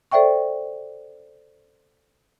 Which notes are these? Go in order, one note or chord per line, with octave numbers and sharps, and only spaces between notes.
A4 C5 D5 E5 G5 C#6